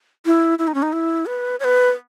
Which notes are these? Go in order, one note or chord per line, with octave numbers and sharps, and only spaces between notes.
E4
E4
D#4
C#4
D#4
E4
B4
C#5
B4